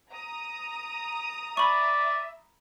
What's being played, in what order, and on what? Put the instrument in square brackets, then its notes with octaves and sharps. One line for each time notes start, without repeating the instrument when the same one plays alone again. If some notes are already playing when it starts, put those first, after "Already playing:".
[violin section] A#5 D#6
[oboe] D5 [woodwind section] E5 [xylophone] B5 C#6